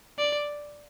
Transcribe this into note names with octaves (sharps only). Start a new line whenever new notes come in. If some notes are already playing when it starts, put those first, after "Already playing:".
D5